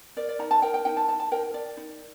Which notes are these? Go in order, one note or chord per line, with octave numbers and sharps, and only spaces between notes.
A#4 D5
D5
D#4 A#5
A5
A#4 G5
G5
D#4 G5
A5
D#4 A5
A5
A#4 G5
A#4 D5
D#4